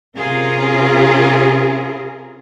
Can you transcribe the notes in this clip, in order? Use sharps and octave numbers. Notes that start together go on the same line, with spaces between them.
C3 C#4 F4 G#4 A#4